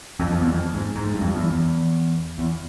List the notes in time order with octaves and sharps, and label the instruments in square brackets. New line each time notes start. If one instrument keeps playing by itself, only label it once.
[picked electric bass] F2
F2
E2
F2
G#2
G#2
G#2
G2
F2
E2
E2
E2